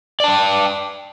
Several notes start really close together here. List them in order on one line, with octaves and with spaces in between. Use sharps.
D5 A5 G5